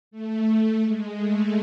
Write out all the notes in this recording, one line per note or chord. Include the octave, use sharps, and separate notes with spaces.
A3
G#3
A3